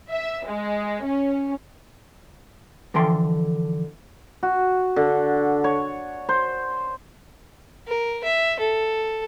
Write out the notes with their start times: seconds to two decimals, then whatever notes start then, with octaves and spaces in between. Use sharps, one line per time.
0.12 E5
0.47 G#3
1.04 C#4
2.94 D3 E3 F3 A4 G5 C6
4.43 F#4
4.96 D3
5.64 C#5
6.29 C5
7.87 A#4
8.24 E5
8.59 A4